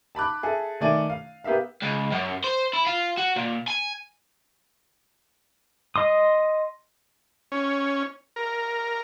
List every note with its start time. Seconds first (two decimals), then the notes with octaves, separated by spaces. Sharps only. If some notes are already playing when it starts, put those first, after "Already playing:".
0.15 A5 B5 D6 F#6
0.43 G#4 A4 E5
0.81 D#3 A3 D5 G#5 D#7
1.10 F5
1.44 B3 G4 A#4 E5 F5
1.82 C#2
2.12 F#2
2.44 C5
2.74 E4
2.87 F4
3.17 F#4
3.36 A#2
3.68 G#5
5.96 D#5 C6 D#6
7.52 C#4
8.36 A#4